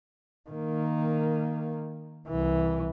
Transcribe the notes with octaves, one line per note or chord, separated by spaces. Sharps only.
D#3 A#3
C2 E3